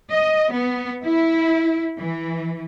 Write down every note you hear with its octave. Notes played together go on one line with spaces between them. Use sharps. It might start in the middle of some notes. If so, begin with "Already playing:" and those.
D#5
B3
E4
E3